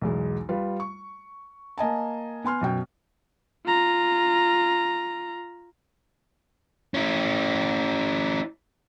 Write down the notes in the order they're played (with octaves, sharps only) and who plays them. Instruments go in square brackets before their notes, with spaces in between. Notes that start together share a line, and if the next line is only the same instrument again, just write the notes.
[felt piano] B1 E2 G#3
G3 F4 B4
C#6
A#3 D#5 G#5 A5
B3 G#5 C6 F6
F#2 B2 G5
[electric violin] F4 A#5
[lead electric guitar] C#4 E4